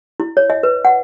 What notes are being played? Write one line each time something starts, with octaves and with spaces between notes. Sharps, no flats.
E4
C#5
D#5
B4
F#5